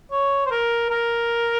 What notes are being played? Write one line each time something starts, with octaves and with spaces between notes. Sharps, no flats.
C#5
C5
A#4
A#4